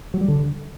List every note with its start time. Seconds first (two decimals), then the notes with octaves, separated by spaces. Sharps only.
0.14 F#3
0.21 G3
0.28 D3